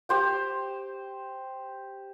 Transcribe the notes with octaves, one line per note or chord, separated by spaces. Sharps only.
G4 C5 G5